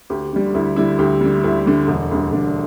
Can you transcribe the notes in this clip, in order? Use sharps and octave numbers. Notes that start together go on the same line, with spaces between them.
D2 G4
D3 G3
D2 E4
D3 G3 E4
D2 G4
D3 G3
D2 E4
D3 G3
E1
D2 D3 G3
E1 D4